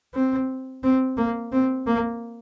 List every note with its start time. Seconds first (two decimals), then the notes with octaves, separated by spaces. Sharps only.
0.14 C4
0.83 C4
1.17 A#3
1.52 C4
1.87 A#3